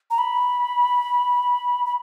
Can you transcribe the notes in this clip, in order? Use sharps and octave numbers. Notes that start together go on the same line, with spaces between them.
A#5
B5
B5